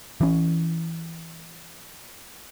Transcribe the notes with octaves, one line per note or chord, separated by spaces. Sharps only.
E3 C#4